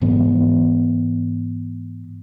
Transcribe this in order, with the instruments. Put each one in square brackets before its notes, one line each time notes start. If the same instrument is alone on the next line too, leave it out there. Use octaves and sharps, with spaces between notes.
[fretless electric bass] G#2 E3 G#3 B3